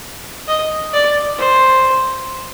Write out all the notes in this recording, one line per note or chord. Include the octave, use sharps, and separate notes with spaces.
D#5
D5
C5